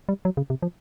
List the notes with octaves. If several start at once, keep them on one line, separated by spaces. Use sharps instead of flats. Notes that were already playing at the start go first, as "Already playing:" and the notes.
G3
F#3
C#3
C3
F3